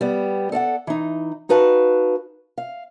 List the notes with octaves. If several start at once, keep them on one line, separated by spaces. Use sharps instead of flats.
G3 B3
A4 D5 F5 F#5
E3 D#4
D#4 F#4 B4 F5 A5
F5